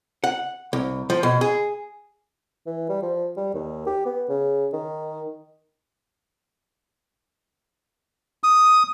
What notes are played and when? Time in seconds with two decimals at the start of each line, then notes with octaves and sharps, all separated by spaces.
0.24 F#5
0.73 C2
1.10 F3
1.23 B2
1.41 G#4
2.66 E3
2.89 G3
3.02 F3
3.37 G3
3.54 D#2
3.87 G4
4.06 B3
4.29 C#3
4.73 D#3
8.44 D#6